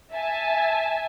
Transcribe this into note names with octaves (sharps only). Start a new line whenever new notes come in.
E5 G#5 A5